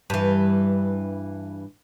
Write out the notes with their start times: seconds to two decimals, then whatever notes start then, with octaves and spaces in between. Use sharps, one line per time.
0.10 G2 E3